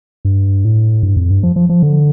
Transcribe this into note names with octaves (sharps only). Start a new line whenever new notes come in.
G2
A2
G2
F2
G2
F3
F3
F3
D3